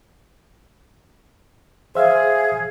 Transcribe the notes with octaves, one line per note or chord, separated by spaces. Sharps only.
G#4 C5 E5 F5